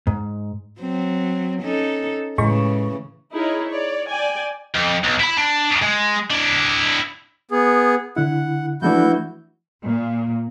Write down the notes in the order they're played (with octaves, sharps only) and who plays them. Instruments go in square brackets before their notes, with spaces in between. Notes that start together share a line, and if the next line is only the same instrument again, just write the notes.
[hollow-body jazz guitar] G#2
[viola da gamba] F#3 C4
C#4 D#4 A4
[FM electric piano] A2 G#3 C#6 [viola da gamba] C#3 E3 A3
[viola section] D#4 E4 G#4 A#4 C#5
C#5 D5
D5 G5 G#5
[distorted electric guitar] F2
B1
E4 B5
D4
G#3
D4 E4
[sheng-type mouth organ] B3 G#4
[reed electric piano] D3 E4 [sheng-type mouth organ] F#5
[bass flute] E3 [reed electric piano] F3 A3 D4 [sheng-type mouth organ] E4 F#4 G6
[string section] A#2